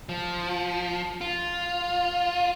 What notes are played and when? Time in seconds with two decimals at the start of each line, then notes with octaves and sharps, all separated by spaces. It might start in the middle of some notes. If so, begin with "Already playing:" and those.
0.09 F3
1.21 F4